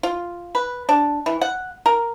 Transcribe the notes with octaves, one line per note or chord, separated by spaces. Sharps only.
F4
B4
D4
E3
F#5
A#4